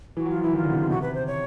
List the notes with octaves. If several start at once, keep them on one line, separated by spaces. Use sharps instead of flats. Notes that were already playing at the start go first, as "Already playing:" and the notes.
E3 F#4
F#3 F4
F3
E3 E4
D#3 F4
D3
C3
B2
C3 F#4
B4
C5
C#5